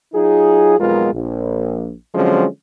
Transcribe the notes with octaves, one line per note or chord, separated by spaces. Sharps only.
F#3 D#4 F4 G#4
B1 F2 G#3 B3 F4 A#4
A#1
D3 F3 F#3 G#3 C4 C#4